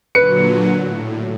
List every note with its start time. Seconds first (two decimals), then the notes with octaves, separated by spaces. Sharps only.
0.15 A#2 D3 F#3 B4 C#7
0.79 A2